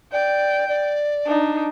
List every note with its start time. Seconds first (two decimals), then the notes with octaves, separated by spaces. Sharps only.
0.12 D5 G5
0.68 D5
1.26 D4 D#4